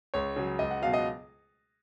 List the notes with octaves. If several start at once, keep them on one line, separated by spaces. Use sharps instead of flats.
C#2 C#5
C#3 F#3
C#2 D#5
F#5
B2 F#3 F5
D#5